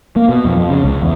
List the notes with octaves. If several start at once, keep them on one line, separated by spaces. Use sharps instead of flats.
A#3
B2
F2
F2
C#3
C#2
E2